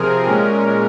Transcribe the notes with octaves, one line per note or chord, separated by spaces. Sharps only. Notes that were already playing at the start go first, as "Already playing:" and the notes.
Already playing: C3 F3 C4 G#4 A#4
A#2 G#3 C#4